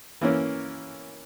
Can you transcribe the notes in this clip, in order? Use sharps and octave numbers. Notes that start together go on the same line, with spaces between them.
E3 A#3 C#4